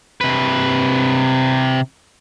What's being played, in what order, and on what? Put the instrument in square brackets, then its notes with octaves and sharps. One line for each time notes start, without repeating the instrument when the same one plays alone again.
[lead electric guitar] C3 B4